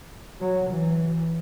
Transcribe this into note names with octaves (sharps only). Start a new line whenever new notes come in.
F#3
E3